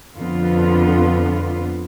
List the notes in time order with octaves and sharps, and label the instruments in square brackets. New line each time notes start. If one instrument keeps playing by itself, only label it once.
[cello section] F2 D3 B3 F4